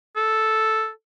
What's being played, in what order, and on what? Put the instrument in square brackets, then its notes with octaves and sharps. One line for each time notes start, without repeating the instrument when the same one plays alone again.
[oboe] A4